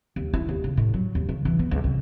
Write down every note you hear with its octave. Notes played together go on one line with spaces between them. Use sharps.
D#2
E4
D#2
C#3
A2
F#3
D#2
C#3
E3
B3
C#2
C2